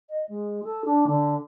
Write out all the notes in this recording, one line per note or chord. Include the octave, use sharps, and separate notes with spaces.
D#5
G#3
A4
D4
D3